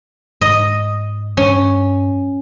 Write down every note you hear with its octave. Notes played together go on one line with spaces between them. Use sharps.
G#2 D#5
G2 C#4